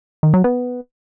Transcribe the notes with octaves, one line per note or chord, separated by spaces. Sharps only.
D#3
F#3
B3